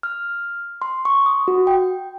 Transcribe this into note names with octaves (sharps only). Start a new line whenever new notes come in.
F6
C6
C#6
D#6
F#4
G5